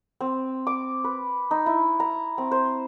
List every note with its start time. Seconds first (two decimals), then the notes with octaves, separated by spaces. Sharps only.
0.21 C4
0.67 D6
1.04 B4
1.51 D#4
1.66 E4
2.00 A#5
2.38 C4
2.51 C5